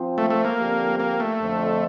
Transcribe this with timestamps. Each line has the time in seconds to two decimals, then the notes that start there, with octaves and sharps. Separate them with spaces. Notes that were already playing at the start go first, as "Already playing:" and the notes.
Already playing: F3 C4 F4 C5
0.18 A3
0.30 A3
0.45 A#3
0.58 D3 F3 C4 G4
0.99 A#3
1.20 A3
1.40 F2 D3 F3